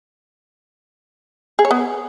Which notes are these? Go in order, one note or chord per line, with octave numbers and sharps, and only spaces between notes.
G#4
C#5
B3